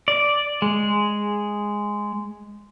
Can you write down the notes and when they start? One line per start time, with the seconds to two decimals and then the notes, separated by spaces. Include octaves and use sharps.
0.08 D5
0.62 G#3